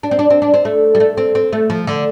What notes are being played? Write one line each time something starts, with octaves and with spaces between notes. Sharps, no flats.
D4
C4
D4
C4
D4
C4
A3
G3
A3
C4
C4
A3
F3
D3